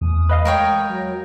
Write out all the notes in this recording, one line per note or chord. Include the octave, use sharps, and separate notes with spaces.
E2 A3 D#6
B4 D#5 F5
G#3 A#4 C#5 G5
F#3